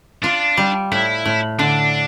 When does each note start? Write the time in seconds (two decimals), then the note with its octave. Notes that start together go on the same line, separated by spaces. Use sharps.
0.23 D4 F4
0.57 G3
0.92 A2 E4
1.25 A2
1.59 D3 D4